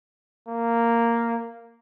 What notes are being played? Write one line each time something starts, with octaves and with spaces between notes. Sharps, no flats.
A#3